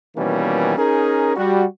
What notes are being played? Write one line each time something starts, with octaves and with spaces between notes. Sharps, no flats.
B2 D#3 E3 G3 A#3 C#4
C#4 D#4 G#4 A#4
G3 F#4